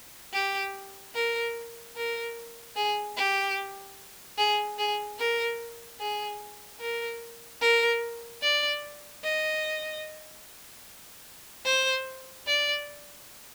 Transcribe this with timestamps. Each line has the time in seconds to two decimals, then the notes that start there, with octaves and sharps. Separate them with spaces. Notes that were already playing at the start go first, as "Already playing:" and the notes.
0.33 G4
1.14 A#4
1.96 A#4
2.76 G#4
3.16 G4
4.38 G#4
4.78 G#4
5.18 A#4
5.99 G#4
6.80 A#4
7.61 A#4
8.42 D5
9.23 D#5
11.65 C5
12.46 D5